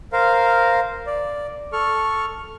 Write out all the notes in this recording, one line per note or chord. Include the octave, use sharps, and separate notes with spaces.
A#4 C5 F5
D5
A4 C#6 F6